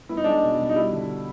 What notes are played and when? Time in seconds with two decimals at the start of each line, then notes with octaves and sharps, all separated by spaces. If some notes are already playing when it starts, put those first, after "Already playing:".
0.09 B3 E4
0.17 D#4
0.24 G#3 D4
0.31 D#4
0.43 B2
0.59 B2
0.69 D#4
0.76 G3 E4
0.92 D3